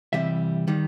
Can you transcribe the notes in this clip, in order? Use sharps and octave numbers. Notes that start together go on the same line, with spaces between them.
C3 E3 G3 E5
D#3 G3